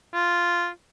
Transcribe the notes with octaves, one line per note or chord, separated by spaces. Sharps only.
F4